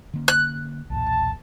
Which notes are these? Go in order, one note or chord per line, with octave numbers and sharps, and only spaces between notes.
D3 A#3 C#4
F#6
B1 E2 A#2 A5